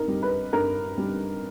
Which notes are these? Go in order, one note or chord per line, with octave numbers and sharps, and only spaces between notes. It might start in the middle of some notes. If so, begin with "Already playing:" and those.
Already playing: G2 D#4 A#4
G3
B4
G2 A#4
G3